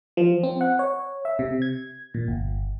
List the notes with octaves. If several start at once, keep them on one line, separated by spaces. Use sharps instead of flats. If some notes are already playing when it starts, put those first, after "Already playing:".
F3
C4
F#5
C#5
E5
C3
G#6
A#2
G1